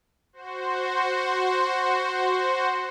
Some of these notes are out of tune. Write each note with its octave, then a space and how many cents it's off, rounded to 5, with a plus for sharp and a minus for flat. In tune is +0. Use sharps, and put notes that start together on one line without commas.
F#4 +0 C5 +0